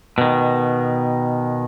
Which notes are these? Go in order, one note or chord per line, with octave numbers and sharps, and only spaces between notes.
B2 D#3